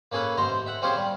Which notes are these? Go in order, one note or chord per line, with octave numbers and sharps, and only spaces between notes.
A#3 C#4 G#4 A4 B4
A1 G#2 C5 A#5 C6
E5 F#5
C4 C#4 F4 G4 G#4 C5
G3